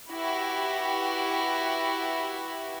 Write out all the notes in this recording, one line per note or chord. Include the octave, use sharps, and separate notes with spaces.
E4 F#4 G4 B4